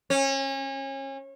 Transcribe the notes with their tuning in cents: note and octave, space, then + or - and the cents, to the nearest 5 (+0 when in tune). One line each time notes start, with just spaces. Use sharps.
C#4 -30